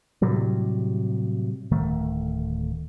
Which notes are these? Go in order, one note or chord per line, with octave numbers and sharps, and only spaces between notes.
A2 C3 F#3 G3
D1 D#3 A3